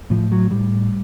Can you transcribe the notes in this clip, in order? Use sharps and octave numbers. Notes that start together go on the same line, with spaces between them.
A2 F3
F#3
A2 G3